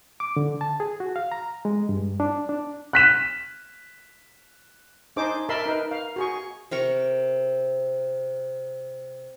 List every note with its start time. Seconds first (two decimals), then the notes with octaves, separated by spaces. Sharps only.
0.20 D6
0.36 D3
0.61 A5
0.80 G#4
1.00 F#4
1.16 F5
1.32 A#5
1.65 G#3
1.89 G2
2.20 D4
2.49 D4
2.93 F#6 B6 E7
5.16 D4 D#4 G#4 C5 D6
5.49 A#4 D#5 E5 A5 B5 C6
5.66 D#4 A#4 B4
5.91 F5
6.16 F#4 G#4 C#6
6.71 C3 A#4 C#6